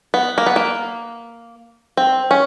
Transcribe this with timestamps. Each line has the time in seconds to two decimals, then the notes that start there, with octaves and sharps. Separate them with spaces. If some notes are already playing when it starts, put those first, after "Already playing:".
0.14 B3
0.38 A#3
0.46 B3
0.56 A#3
1.97 C4
2.31 C#4